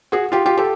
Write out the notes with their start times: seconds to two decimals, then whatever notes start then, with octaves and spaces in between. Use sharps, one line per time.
0.12 F#4 G#4
0.32 F4 G4
0.46 F4 G4
0.57 G4 A4